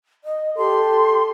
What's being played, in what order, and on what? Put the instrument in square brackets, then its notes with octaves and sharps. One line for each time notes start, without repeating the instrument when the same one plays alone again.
[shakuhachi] D#5
[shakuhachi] G4 [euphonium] A4 [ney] C6